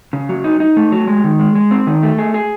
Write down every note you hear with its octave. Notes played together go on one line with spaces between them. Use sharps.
C#3
F#3
D#4
D#4
A3
F#3
G#3
D#3
G#3
G#3
C4
D#3
A3
G#4
G#4